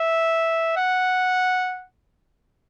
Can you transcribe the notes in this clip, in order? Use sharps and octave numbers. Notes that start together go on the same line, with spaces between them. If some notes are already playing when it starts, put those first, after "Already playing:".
Already playing: E5
F#5